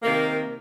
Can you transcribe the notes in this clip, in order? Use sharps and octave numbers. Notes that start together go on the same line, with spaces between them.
C3 D#3 A#3